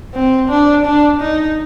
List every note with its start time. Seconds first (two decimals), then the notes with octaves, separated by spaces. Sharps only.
0.14 C4
0.49 D4
0.85 D4
1.21 D#4